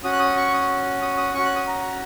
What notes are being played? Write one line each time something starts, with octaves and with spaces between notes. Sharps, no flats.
C#4 F#4 D#6
F#6
D#6
C#6
D#6
D#6
D#6
C#4 F#4 C#6
F#6
D#6
A#5